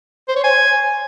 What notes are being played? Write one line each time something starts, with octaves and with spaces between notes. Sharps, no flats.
C5
C#5
G#5